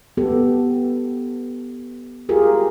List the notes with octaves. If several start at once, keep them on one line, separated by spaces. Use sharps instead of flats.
B3 G4 A4
F4 G4 G#4 A#4